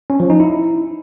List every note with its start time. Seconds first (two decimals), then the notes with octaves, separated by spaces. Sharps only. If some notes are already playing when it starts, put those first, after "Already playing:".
0.10 C#4
0.20 F3
0.30 D#4
0.40 E4